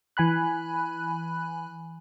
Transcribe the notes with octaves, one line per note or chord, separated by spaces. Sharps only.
E3 G#5 B5 F#6